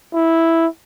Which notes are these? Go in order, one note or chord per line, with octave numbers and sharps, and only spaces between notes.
E4